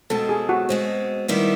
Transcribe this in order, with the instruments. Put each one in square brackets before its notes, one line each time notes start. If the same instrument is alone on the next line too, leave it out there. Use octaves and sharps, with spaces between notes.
[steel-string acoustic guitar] B2 G#3 C4 [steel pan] A4
[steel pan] G#4
F#4
[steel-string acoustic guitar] B2 G#3 C4
D#3 G3 B3 E4